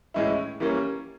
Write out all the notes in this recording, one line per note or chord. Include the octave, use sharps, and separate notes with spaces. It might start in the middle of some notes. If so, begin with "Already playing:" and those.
A2 E3 G#3 C#4 E4
E3 G3 A#3 C#4